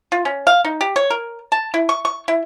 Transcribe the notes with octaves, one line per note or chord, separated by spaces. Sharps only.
F4
C#4
F5
D#4
G4
C#5
A#4
A5
E4
C#6
C#6
E4